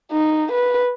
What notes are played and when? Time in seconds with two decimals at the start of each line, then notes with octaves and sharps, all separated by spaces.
0.12 D#4
0.52 B4